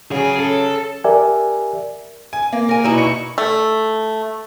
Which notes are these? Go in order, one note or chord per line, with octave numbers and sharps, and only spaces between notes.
C#3 F#3 G#4
A4
G4 A#4 D5 E5 G#5
G#5
A#3
A#4 G#5
B2 D#4 E4
C#6 C#7
A3